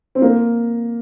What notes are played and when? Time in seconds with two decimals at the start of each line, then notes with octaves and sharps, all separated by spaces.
0.15 C4
0.22 A#3